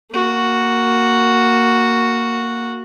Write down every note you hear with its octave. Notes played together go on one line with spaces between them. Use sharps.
A#3 F#4